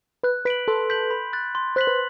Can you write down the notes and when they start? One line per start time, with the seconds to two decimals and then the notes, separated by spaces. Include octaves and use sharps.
0.23 B4 F#6
0.45 B4 B6 D7 F#7
0.68 A4 C6
0.90 G6 B6 F#7
1.11 B5
1.33 F#6 A6
1.55 C6
1.76 C5 F#6 B6 F#7
1.87 B4